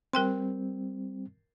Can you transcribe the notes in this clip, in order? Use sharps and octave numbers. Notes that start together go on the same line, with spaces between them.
G3 C4 A#4 G5 C6